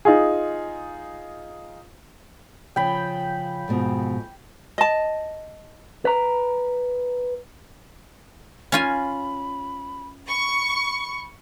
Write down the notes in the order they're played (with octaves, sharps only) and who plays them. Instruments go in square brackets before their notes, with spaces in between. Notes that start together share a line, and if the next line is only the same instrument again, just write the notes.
[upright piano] D#4 F4 G#4
[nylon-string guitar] C#3 F3 [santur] G5 B5
[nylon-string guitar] F2 G#2 B2
[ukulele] D#5 A5
[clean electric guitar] B4 A#5
[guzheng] C#4 F4 G#5 [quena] B5
[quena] B5 [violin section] C#6